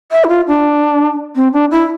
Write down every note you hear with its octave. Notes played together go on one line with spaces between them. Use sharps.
E5
E4
F4
D4
C4
D4
E4